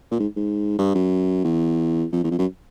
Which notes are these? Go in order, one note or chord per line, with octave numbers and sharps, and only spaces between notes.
A#2
G#2
G#2
G2
F#2
E2
F2
E2
F2
F#2